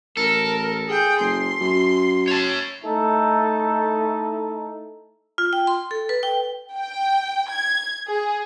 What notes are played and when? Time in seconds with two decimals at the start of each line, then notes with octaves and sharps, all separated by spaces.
0.17 A1 A4 A#4
0.88 G#4 G5
1.20 F#1 C6
1.61 F#2
2.28 C#5 A5
2.84 A3 D#4 E4 A4
5.38 F4
5.53 G5
5.67 C6
5.91 A4
6.09 B4
6.23 G5
6.73 G5
7.51 G#6
8.08 G#4